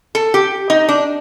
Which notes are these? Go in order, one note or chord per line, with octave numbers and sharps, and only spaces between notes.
A4
G4
D#4
D4